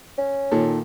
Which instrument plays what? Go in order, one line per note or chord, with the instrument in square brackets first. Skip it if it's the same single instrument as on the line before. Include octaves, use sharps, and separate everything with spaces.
[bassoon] C#4
[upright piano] A#2 D#3 A4